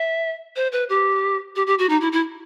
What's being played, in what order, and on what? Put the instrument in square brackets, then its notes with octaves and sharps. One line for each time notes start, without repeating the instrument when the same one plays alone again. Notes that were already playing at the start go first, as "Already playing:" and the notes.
Already playing: [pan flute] E5
C5
B4
G4
G4
G4
F#4
D#4
E4
E4